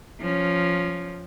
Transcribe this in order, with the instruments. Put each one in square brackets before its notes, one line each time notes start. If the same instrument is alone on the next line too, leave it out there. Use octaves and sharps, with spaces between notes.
[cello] F3 C#4